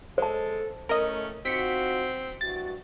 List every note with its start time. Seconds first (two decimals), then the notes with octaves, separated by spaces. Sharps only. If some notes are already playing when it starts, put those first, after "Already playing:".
0.18 G#3 A4 C5 A5
0.89 A2 A3 C#4 A#4 D#5
1.45 C4 D#4 F4 F#4 B6 C#7
2.41 G2 E4 F#4 A6